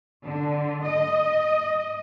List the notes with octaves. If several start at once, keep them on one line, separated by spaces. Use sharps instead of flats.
D3
D#5